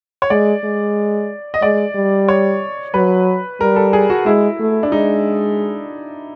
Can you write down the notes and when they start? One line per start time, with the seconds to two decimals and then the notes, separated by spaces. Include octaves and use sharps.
0.22 C#5
0.30 G#3 D5
0.64 G#3
1.54 D#5
1.62 G#3 D5
1.95 G3
2.28 C#5
2.94 F#3 B4
3.61 G3 A#4
3.76 A4
3.93 G#4
4.10 F#4
4.26 G#3 E4
4.60 A3
4.83 D4
4.92 G#3 D#4